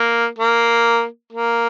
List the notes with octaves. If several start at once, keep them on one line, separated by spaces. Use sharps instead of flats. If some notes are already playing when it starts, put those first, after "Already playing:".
Already playing: A#3
A#3
A#3